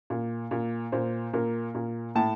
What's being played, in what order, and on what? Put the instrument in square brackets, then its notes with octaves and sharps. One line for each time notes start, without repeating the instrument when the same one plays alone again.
[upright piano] A#2
A#2
A#2 C5
A#2 A#4
A#2
A2 A5